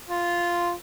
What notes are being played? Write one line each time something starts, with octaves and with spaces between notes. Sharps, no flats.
F4